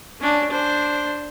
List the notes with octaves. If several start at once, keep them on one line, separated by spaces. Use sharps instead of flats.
C#4 D4
D4 C5